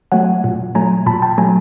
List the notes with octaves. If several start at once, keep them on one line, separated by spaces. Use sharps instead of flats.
F#3 A3 F#5 G#5
A#2
F#3 A3 G#5 A#5
A#2 A5 B5
G5 A5
F#3 A3 G#5 A#5